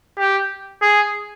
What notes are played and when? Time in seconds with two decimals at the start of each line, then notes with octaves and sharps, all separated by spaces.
0.18 G4
0.82 G#4